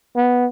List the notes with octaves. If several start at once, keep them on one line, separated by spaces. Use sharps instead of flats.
B3